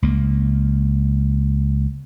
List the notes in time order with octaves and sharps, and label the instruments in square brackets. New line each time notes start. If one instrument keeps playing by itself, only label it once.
[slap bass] C#2 A#3